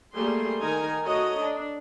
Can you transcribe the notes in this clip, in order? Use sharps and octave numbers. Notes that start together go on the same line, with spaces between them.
G3 A3 A#3 G#4 C6
D#3 D#4 A#4 G#5 A#5
A3 F#4 C#5 D#5 A#5
D4